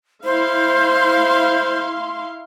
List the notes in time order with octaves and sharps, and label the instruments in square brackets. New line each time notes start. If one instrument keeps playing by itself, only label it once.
[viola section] E4 F5 C6 [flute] C5